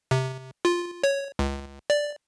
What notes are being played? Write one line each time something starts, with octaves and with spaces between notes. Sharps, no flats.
C3
F4
C#5
C#2
D5